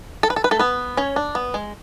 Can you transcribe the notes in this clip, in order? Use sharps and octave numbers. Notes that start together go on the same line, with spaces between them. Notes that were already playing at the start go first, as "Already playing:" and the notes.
A4
B4
A4
B4
A3 A4
B3 B4
C#4 C#5
D4
B3
G#3